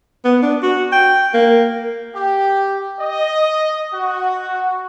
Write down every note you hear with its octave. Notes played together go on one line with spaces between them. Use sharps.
B3
D4
F#4
G5
A#3
G4
D#5
F#4